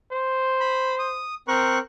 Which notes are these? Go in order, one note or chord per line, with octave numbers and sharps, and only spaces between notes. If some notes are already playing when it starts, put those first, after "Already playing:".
C5
B5
D#6
C4 A#4 C#6 F#6